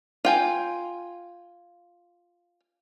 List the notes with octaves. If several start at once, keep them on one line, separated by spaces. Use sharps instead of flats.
F4 G5 G#5